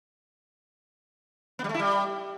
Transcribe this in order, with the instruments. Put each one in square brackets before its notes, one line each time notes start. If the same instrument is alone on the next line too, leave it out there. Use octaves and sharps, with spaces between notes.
[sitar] B3
G3
A3
E4
G3